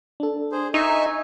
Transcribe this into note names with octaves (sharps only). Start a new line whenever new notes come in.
D4 A4
G#4 C5
D#4 D#5 E5 G#5 C#6